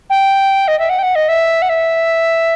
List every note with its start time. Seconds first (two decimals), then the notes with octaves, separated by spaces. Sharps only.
0.10 G5
0.68 D#5
0.79 E5
0.89 F#5
0.99 G5
1.03 F#5
1.15 D#5
1.28 E5
1.62 F#5
1.69 E5